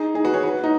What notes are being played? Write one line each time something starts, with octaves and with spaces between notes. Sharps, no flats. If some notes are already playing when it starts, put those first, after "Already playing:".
Already playing: D#4 G#4
D#4 G#4
F#4 B4
G#4 C#5
F#4 B4
D#4